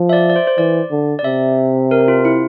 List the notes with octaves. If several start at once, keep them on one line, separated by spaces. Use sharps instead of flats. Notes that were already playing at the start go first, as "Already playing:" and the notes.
Already playing: F3
E5
D5
D5
C5
C5
E3 D5
D3
D5
C3 E5
A#4
F4
E4